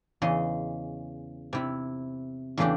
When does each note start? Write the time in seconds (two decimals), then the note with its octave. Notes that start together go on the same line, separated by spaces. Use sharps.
0.22 E2 C#3 D#5
1.53 C3 E4
2.57 E2 C#3 A3 D4 G4